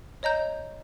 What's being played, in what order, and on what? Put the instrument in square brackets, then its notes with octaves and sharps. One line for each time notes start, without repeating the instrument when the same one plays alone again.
[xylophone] C#5 D#5 A#5 G6